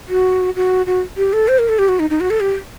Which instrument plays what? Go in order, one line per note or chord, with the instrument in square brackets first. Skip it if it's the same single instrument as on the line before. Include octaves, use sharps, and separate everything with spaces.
[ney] F#4
F#4
F#4
G4
A4
C5
A#4
A4
G4
F#4
D#4
D#4
F#4
A4
G4